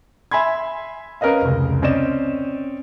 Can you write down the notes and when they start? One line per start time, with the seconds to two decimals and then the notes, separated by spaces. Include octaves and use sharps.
0.31 E5 G#5 B5 C6 G#6
1.21 C#4 A#4 B4 D#5 F5
1.42 F1 C#2
1.82 C4 C#4 D5 D#5 E7